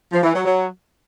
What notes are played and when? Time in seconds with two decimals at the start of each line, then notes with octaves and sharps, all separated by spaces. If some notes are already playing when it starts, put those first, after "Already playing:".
0.12 F3
0.23 E3
0.34 F#3
0.45 F#3